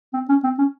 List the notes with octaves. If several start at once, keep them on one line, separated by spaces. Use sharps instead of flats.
C4
C#4
C4
C#4